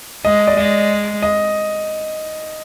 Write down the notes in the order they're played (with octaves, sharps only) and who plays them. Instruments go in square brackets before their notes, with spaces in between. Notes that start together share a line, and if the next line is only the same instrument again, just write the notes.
[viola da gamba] G#3 [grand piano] D#5
[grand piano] D5
[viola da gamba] G#3 [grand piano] D#5
[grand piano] D#5